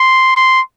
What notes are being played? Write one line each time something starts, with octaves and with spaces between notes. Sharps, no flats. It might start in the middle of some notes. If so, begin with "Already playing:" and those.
Already playing: C6
C6